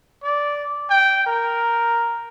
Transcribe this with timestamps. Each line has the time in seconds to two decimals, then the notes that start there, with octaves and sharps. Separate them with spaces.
0.23 D5
0.90 G5
1.27 A#4